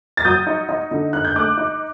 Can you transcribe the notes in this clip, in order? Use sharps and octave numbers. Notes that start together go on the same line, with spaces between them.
A6
F#3 D#6 G6
D#4
D#4
D3
D#4 F#6
G6
A3 D6 F#6
D#4